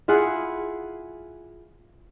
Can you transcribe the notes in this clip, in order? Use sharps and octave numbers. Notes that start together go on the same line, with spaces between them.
E4 F4 G#4 F#5